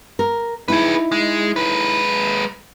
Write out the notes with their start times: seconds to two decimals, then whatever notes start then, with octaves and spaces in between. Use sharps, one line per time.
0.19 A#4
0.68 D#4 E4 G#4 B4
1.12 G#3
1.56 G#3 B4